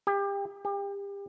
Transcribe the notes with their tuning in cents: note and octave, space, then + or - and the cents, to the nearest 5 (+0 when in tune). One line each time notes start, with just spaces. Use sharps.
G4 +30
G4 +35